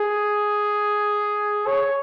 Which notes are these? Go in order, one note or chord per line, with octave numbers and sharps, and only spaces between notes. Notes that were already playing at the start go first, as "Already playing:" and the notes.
Already playing: G#4
C#5